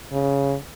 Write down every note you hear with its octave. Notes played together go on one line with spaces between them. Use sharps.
C#3